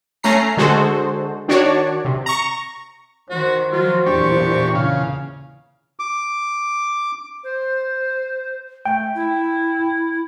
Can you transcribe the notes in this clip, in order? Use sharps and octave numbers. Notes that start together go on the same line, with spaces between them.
A3 C#4 A#5 C7
D3 G#3 F#4 G#4 A4 C5
D#3 D4 F#4 C#5 D5
C3
A#5 C#6
D#3 F#4 C5
F3 F#3 F4 F#4
E2 A#2 E3 D4 G4 C#6
C#3 F5
D6
C5
A3 G5
E4